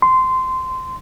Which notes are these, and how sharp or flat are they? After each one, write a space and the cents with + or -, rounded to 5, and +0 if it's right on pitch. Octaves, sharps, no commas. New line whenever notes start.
C6 -15